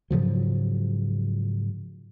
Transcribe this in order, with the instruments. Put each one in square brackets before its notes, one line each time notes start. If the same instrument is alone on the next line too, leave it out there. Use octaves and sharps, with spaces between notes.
[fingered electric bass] G#2 C#3 F3 F#3